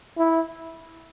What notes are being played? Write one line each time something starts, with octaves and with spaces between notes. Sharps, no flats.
E4